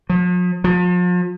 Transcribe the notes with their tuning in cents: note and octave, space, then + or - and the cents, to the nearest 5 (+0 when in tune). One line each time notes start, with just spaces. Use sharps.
F3 +45
F3 +40